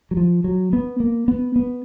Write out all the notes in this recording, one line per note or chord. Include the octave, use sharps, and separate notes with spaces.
F#3
F3
F#3
B3
A#3
B3
B3